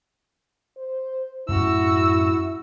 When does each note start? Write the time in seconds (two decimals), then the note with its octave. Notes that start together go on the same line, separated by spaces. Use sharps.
0.78 C5
1.48 F#2 A2 C#4 E4 F#4 E6